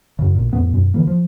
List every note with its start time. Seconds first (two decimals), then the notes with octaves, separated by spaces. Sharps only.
0.19 F#2 C#3
0.35 A1 A#2
0.53 F2 A2 B3
0.73 F#2 B2
0.94 D3 E3 A#3
1.07 F3